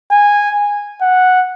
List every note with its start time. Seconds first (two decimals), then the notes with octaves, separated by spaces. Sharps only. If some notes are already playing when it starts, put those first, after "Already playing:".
0.12 G#5
1.02 F#5